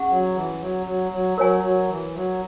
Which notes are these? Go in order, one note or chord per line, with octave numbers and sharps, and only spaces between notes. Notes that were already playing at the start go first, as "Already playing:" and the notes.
Already playing: C#4 G#4 F#5 C#6
F#3
E3
F#3
F#3
F#3
F#3 A#4 C#5 G#5
F#3
E3
F#3